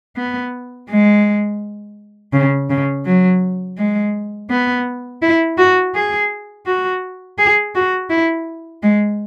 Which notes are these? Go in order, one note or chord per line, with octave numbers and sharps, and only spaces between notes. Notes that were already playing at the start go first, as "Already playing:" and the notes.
B3
G#3
C#3
C#3
F#3
G#3
B3
E4
F#4
G#4
F#4
G#4
F#4
E4
G#3